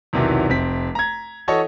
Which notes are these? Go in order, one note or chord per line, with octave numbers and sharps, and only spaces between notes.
B1 E2 C3 D#3 E3 F#3
F1 C4 B6
A#5 G#6
E3 F#4 A4 C#5 D#5